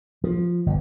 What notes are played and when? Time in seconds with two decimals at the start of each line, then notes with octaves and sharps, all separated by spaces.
0.24 F3
0.66 G1